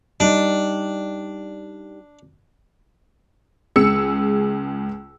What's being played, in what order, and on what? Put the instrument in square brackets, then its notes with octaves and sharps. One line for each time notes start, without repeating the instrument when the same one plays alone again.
[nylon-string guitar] G3 D#4 [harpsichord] D4
[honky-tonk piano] C#2 G#4 E6 C#7